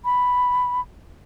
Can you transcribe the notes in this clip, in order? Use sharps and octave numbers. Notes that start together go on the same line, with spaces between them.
B5